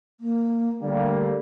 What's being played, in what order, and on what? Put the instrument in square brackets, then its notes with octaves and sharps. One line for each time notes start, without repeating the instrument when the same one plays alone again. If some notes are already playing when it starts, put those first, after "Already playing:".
[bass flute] A#3
[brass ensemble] D3 G3 A#3 [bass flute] A3